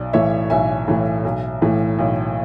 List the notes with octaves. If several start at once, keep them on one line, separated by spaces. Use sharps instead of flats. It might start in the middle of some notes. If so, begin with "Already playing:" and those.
Already playing: B1 D5
A2 E3 C#5 E5
B1 E5 G#5
A2 E3
B1
A2 E3
B1